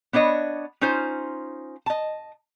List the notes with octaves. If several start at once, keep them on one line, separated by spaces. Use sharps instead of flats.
B3 D4 C#5 D#5
C#4 D#4 F4 C5
D#5 A5